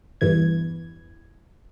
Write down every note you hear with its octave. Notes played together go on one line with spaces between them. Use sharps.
E2 G2 E3 G#6